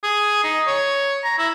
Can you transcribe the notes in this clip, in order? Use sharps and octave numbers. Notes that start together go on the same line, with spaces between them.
G#4
D#4
C#5
A#5
E4